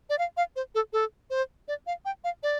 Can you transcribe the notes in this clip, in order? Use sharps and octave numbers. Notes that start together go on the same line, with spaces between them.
D5
F5
F5
C5
A4
A4
C5
D5
F5
G5
F5
D5